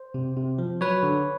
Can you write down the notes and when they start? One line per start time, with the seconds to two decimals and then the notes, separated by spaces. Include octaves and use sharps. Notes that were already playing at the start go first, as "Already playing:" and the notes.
Already playing: C5
0.14 C3
0.37 C3
0.58 F3
0.81 F#3 B4 C#5
1.03 D3